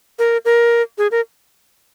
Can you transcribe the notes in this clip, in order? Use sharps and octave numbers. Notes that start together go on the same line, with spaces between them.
A#4
A#4
G#4
A#4